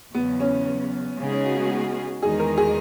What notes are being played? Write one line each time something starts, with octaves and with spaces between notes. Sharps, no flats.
E2 C#3 F#3 B3
C#4
C#3 G#3 B3 D#4 G#4
C#4
F#4
F#4
F#4
E2 D#3 G#3 D#4 G#4
A#4
G#4